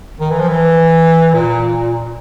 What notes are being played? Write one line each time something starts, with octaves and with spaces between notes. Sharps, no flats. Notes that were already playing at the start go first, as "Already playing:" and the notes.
D#3
E3
F3
E3
A#2